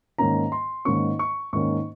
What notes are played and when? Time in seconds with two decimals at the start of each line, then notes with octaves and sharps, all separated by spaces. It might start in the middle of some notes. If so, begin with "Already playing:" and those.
0.18 G#2 D#3 A#3 C#4 A#5
0.52 C6
0.85 G#2 D#3 A#3 C#4 C#6
1.19 C#6
1.53 G#2 D#3 A#3 C#4 C#6